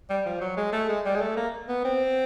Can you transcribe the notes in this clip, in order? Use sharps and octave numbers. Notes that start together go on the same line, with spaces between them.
G3
F3
F#3
G#3
A3
G#3
G3
G#3
A3
A#3
B3
C4